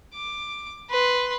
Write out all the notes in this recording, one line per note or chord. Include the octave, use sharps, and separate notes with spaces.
D6
B4 C6